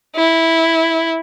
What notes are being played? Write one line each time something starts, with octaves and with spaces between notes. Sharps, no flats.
E4